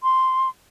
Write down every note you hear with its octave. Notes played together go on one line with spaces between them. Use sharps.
C6